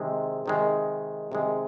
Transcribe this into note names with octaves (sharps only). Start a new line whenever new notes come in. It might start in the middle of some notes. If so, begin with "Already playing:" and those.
Already playing: C3 D#3 G#3
C3 D#3 G#3
C3 D#3 G#3